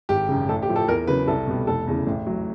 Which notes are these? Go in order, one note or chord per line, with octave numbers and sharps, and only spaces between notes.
G#1 G4
F#2 C#3
A1 A4
G4
A2 F3
A4
E2 A#4
C#3 F#3 B4
C2 A4
B2 G3 B3
F1 A4
E2 C#3
A1
A2 F#3